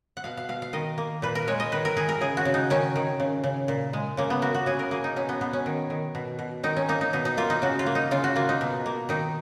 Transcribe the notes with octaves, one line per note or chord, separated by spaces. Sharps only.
F#5
B2 F5
F5
B2 F5
F5
D#3 D#5
A#3
A#2 B4
A#4
G#3 C#5
D#5
D#3 B4
A#4
D#3 G#4
A#4
C#3 G#4
F#4
C#3
D#4
D#3 C#4
D#3
C#3
C#3
A#2
G#3
C#3 A#3
B3
A#3 F#4
F#4
C#3 G#4
A#4
A#3 G#4
D#4
B2 C#4
B3
B2 B3
C#4
D#3
D#3
B2
B2
D#3 D#4
C#4
A#3 D#4
D#4
B2 D#4
D#4
A#3 F4
D#4
C#3 F#4
F4
A#3
D#4
C#3 F4
F#4
A#3 F4
D#4
B2
A#3
D#3 D#4